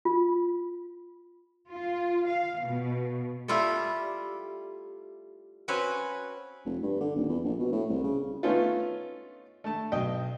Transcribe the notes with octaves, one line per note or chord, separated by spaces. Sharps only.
F4
F4
F5
B2
G3 A3 E4 F4 G4 A4
C4 C#4 F#4 B4 C#5 G#5
F1
G2
D3
D#1
E2
A#1
B2
A2
C2
C#3
A3 B3 C#4 D#4 F4
A3 A5
B1 D#5 G5